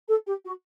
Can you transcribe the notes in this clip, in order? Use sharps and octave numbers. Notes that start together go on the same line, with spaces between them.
A4
G4
F#4